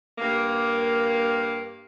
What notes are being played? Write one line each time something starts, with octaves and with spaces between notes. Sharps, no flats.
G2 A#3